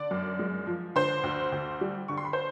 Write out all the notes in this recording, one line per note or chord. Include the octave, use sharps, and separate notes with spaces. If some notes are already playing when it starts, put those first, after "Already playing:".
Already playing: D3 D5 D6
F#2
G#3
F3
D3 C5 C6
D2
D2
G3
D3 C#6
C6
B5
C5 C6